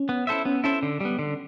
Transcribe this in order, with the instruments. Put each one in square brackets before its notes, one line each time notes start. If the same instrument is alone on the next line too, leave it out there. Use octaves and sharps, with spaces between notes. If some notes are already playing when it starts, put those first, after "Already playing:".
Already playing: [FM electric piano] C#4
[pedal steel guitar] B3
E4 A4 C5 E5
[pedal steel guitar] B3 [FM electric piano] C#4
[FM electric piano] C#4 [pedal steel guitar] E4 A4 C5 E5
[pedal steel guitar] D3
G3 B3
D3